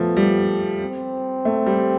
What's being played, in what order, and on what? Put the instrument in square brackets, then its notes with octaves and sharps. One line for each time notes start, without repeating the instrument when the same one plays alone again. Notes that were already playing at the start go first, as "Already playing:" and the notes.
Already playing: [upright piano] F3 A3 [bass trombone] B3
[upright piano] G3
[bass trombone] C4
[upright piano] A3
G3